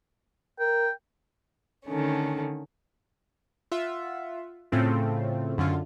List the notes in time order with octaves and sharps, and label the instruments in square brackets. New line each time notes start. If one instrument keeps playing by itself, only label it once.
[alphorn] A#4 [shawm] G5
[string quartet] D3 D#3 A3 C#4
[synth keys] F4 E5 F#5
A2 C#3 A3 C4 F4
F#2 D3 C#4 F4